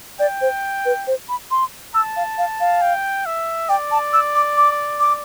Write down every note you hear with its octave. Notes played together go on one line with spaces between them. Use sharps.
D5 G5
C5
B4
C5
B5
C6
A5 E6
F5
F5
F5
G5
E5
D5 G5
A5
E6
D6
D6
D6